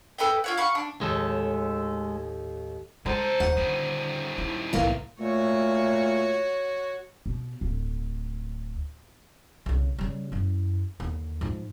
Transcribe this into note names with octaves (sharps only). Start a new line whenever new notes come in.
A4 B4 D#5 G5
F4 C#5 F#5
F5 B5 C#6
D4
D#2 A2 G#3 A4
C2 G#3 A4 C5 A#5 C6
D#2 G#3 F#5
D3 D#3 G3
E4
C2 A2 E3 A#3 B3
A#2 A3 F#4 C#5
B2
D1
C2 C#3
C#3 G3
F#2 E4
D#2 D3
G#2 F3